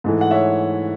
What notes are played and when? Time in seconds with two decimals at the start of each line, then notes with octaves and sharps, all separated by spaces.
0.04 G#2 E3 A3
0.21 F#5
0.31 C#5 E5